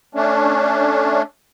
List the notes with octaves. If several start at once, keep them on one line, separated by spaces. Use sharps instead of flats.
A3 C#4 D4